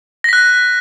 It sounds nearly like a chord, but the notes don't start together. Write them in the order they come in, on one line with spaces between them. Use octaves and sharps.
A#6 B6 F#6